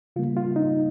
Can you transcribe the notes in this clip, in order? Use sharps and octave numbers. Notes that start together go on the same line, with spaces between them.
C#3 G3 A#3 F4
F4
D#4